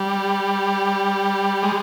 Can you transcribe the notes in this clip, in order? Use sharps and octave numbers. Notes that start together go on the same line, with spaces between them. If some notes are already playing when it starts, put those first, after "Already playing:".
Already playing: G3
G#3